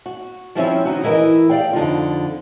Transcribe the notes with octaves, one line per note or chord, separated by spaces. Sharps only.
F#4
F3 G3 C4 C#4 E4 E5
D#3 D#4 F#4
E3 E4 A#4 D#5
G4 A#4 D5 F5 G5
F2 D3 D#4 F4